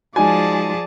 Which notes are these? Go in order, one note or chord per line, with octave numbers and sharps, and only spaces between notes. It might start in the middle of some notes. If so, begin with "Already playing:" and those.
F3 G#3 D#4 F#4 G#4 D5 G#5 A5